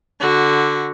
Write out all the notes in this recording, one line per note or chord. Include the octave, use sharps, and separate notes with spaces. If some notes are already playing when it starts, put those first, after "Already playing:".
D3 F#4